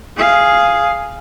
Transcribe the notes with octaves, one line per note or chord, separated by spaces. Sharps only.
G#4 F5